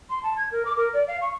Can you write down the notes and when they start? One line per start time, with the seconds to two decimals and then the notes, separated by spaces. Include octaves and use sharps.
0.10 C6
0.23 A5
0.37 G#6
0.52 A#4
0.65 D6
0.77 A#4
0.93 D5
1.08 F5
1.21 C#6